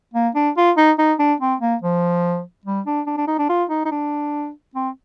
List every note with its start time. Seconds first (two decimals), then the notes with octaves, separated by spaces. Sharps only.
0.14 A#3
0.35 D4
0.57 F4
0.77 D#4
0.98 D#4
1.19 D4
1.40 C4
1.60 A#3
1.82 F3
2.66 G3
2.86 D4
3.07 D4
3.17 D4
3.28 D#4
3.38 D4
3.49 F4
3.69 D#4
3.85 D#4
3.91 D4
4.75 C4